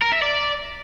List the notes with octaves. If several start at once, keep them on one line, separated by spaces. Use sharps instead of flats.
A#4
E5
D5